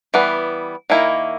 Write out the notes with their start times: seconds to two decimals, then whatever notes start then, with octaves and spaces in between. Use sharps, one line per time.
0.14 E3 G3 B3
0.90 D#3 A#3 E4